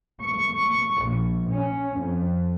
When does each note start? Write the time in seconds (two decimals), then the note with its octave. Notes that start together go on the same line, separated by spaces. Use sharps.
0.20 C#6
1.04 A#1
1.51 C#4
1.98 F2